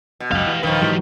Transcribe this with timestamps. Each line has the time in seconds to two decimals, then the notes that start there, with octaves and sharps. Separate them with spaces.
0.20 B2
0.32 F#1 C#2 F#2 G4 F5
0.47 E3
0.63 D#1 A#1 D#3 F3 B4 F5
0.82 G#2 E3 F#3 G4